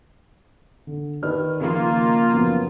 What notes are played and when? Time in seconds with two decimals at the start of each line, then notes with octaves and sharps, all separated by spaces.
0.87 D3
1.23 D#3 B4 D5 F6
1.61 C#3 F3 A#3 F4
2.34 F#2 F3 B3